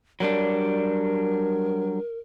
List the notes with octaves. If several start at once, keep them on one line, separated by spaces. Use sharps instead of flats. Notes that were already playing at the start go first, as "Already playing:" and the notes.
F#3 G3 D4 A#4